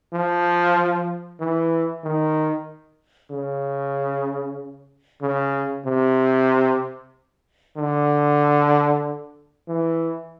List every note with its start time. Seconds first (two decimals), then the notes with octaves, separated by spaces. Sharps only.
0.13 F3
1.40 E3
2.04 D#3
3.31 C#3
5.22 C#3
5.86 C3
7.77 D3
9.68 E3